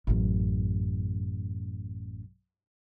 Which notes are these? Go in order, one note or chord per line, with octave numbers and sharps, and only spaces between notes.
A1 F#2